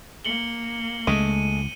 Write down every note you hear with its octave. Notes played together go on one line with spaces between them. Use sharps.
A#3 C#7 F#7 G7
C#2 G#3 A3 D#7